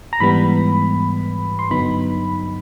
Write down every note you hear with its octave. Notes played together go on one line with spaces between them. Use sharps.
A#5
G#2 E3 G3 B3 B5
C6
G2 D3 F#3 B3 D#4 B5